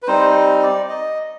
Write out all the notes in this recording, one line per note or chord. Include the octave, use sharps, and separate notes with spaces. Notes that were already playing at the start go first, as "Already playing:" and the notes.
B4
G3 C4 D#4 C5
D5
D#5